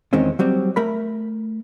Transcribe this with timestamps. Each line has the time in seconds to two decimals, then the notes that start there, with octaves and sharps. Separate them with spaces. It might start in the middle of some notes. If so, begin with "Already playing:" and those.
0.13 E2 D#3 G#3 C4 C#4
0.39 F#3 G3 C4
0.76 A3 A#4 B5